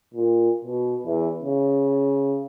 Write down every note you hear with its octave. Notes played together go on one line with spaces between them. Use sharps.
A#2
B2
E2
C#3